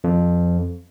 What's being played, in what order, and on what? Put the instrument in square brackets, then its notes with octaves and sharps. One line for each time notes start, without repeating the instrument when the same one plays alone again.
[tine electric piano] F2